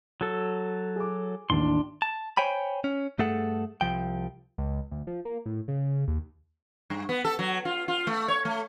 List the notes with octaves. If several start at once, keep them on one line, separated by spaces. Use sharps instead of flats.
F#3 A4
G#4 D6
A1 D#2 D4 C6
A5
C5 C#5 G5 G#5 B5
C#4
G2 A3 G#4 A4 F#5
C2 F3 G5
C#2
D2
F3
A#3
A2
C#3
D#2
G2
B3
A4
F#3
F4
F4
A3
C#5
A3